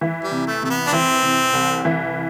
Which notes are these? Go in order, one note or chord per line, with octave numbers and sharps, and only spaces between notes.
E3
G3
C3
A3
C3 A3
B3
D4
E3 C4
C3
C2
E3